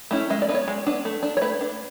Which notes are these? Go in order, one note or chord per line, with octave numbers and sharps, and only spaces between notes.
A3 C#4 E4
G#3 E5
D5
B3 D4
C#5
G#3
B3 D4
A3
D4
C#5
A3 B4
D4